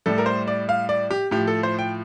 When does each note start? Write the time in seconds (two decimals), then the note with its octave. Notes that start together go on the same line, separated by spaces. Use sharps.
0.06 A2 G3 A4
0.18 A#4
0.26 C5
0.48 D5
0.69 F5
0.89 D5
1.11 G4
1.31 A2 F3 G4
1.47 A4
1.63 C5
1.79 G5